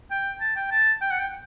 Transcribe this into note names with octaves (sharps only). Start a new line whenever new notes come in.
G5
A5
G5
A5
G5
F#5
G5